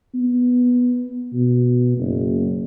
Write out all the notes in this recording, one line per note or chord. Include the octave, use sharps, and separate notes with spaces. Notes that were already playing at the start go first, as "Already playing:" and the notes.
B3
B2
F#1